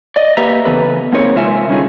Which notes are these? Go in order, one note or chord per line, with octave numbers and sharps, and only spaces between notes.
D5 D#5
A#3 G4 B4 E5 A#5
C#3 E3 B3 A4 B4
A#3 C4 D#4 G#4 A#4 C#5
C3 G#3 F4 A#4 E5 G#5
D3 G3 C#4 D#4 F4 G#4